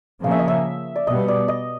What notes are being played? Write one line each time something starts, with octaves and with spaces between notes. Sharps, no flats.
C#3 F3 A#3 C#4 F5
E5
D#5
E5
D5
B2 G3 B3 D#5
D5
D#5